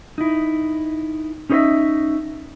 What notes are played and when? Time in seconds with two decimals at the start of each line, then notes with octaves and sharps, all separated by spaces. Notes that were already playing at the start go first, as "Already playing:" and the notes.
0.18 D#4 E4
1.50 C#4 D#4 G4 C5 D#5 E5